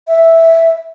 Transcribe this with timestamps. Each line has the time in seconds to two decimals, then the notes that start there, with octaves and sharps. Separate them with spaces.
0.08 E5